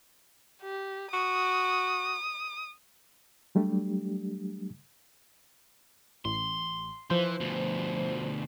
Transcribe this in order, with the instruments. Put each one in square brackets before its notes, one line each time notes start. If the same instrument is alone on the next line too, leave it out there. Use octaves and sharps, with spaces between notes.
[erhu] G4
[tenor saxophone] F#4 [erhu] D#6
[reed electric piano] F#3 G3 A3 D4 G4
[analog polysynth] A1 [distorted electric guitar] C6
[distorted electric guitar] E3 [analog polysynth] F3 C5
[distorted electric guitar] D2 B2